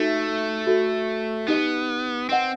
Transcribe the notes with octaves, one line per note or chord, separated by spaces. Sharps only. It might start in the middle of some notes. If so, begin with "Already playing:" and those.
Already playing: A3 D#4 F#4 A4 E5
F#4 A4 E5
B3 D#4 G4 D#5
C4 B4 D#5 F#5